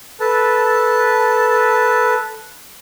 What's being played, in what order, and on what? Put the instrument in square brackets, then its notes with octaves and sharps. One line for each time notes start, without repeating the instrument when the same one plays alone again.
[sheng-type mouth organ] A4 B4 A5